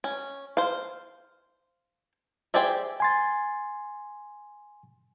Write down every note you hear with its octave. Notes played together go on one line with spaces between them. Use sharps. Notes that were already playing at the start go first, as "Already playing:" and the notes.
C#4
C5 F5
G4 G#4 C5 D5 E5
G#5 C6 A6